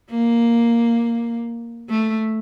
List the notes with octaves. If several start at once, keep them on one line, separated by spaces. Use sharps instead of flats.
A#3
A3